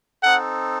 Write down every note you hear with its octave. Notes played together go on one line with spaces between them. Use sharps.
C4 D#4 A4 F#5